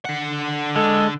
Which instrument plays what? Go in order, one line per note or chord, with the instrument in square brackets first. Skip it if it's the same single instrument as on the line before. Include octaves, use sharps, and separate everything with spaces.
[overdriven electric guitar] D3 F#5
[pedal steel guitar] G#3 [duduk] A4